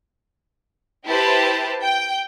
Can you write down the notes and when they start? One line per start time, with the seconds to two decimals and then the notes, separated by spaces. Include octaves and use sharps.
1.06 E4 G4 B4 C5 A5
1.82 G5